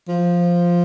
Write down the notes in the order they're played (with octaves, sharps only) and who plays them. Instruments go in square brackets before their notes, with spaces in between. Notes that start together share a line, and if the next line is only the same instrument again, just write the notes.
[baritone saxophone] F3